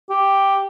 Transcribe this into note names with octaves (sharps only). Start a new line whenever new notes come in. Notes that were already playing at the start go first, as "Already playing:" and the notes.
G4